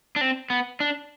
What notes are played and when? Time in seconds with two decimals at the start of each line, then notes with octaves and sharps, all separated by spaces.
0.16 D4
0.21 C4
0.50 B3
0.80 D4